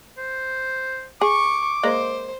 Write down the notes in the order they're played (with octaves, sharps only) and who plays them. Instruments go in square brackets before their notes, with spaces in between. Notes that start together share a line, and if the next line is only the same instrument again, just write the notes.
[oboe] C5
[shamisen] G#4 [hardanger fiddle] C#6 [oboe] D6
[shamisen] G#3 A#3 D5 [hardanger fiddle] C5